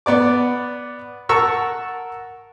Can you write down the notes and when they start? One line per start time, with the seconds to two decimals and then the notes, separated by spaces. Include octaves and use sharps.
0.06 B3 D5 D6
1.29 A#4 F#5 A5 A#5 C#6 E6